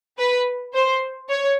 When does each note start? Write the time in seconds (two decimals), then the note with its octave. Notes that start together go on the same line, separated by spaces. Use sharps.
0.18 B4
0.74 C5
1.29 C#5